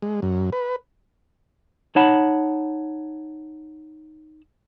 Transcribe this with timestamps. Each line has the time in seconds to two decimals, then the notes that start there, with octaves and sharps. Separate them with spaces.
0.02 G#3
0.22 F#2
0.53 B4
1.96 D#4 C#5 F#5 A5 B5